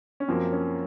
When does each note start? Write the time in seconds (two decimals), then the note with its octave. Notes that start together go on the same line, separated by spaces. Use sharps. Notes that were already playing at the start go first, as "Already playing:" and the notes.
0.20 C#4
0.28 F#2 F3 A#3 C4
0.52 C#4